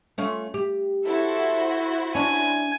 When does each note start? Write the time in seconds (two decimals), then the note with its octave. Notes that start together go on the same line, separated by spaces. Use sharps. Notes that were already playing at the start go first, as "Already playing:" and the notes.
0.18 A3 C#4 F4
0.54 G4
1.06 E4 F#4 A4 C5
2.15 C#4 D4 G#5